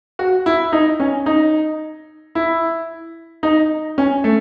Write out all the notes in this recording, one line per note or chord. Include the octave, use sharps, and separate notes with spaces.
F#4
E4
D#4
C#4
D#4
E4
D#4
C#4
A3